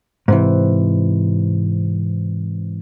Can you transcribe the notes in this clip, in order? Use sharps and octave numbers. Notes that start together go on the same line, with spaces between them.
G#2 C3 E3